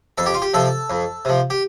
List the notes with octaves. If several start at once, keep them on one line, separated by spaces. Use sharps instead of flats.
F2 A4
G4
F4
G4
C3 F3 A4
F2
C3 F3
G4